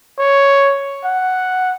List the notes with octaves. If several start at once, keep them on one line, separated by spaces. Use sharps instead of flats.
C#5
F#5